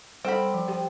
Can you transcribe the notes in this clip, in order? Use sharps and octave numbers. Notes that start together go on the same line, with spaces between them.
G3 C4 A4 F#5 B5
F3
G4 C5 G5